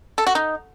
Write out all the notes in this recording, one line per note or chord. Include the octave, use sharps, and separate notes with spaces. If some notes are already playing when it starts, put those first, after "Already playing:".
A4
F#4
D#4